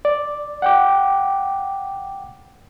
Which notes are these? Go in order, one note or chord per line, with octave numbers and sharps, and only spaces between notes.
D5
F#5 G5 D6